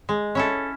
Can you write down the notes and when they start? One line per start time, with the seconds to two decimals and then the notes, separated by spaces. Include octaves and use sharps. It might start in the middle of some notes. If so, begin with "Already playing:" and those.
0.09 G#3
0.35 C#4 E4 A4